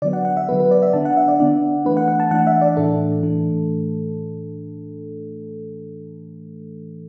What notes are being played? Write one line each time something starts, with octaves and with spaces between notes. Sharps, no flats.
D3 F#3 B3 D5
F#5
F#5
E5
D3 F#3 B3 B4
B4
D5
E5
D3 B3 D4 A5
F#5
E5
D5
D3 B3 D4 D5
E3 A3 D4 B4
F#5
F#5
A5
E3 A3 D4 F#5
E5
D5
A2 E3 A3 D4 A4
A2 E3 A3 D4